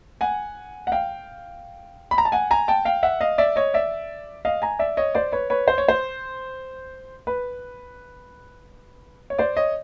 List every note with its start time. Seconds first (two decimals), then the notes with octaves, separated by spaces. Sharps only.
0.21 F#5 G#5
0.87 F#5
0.92 F5 G5
2.11 B5
2.18 A#5
2.25 A5
2.32 F#5 G#5
2.51 G#5 A#5
2.68 G5 A5
2.85 F5 G5
3.03 E5 F#5
3.21 D#5 F5
3.38 D5 E5
3.56 C#5 D#5
3.74 D5 E5
4.45 D#5 F5
4.62 G#5 A#5
4.79 D5 E5
4.97 C#5 D#5
5.15 C5 D5
5.32 B4 C#5
5.50 B4 C#5
5.68 C5
5.78 C#5
5.88 C5
7.27 B4
9.30 C#5
9.38 C5 D5
9.57 C#5 D#5